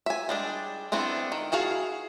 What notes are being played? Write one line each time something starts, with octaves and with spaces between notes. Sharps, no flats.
E5 G#5
G3 G#3 D4
A3 B3 C4 D4 E4
D#3
E4 F#4 G#4 F5 A5